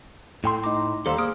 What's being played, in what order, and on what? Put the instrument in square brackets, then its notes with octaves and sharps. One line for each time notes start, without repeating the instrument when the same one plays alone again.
[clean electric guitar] A2 G5 C6 [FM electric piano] A3
[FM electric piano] D#4 A#5 [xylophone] D6
[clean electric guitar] D#2 G3 A4 [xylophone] C5 F5 C6 [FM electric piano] A#5 E6
[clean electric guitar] A#3 [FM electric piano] G#4 [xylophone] D#6 F6 D7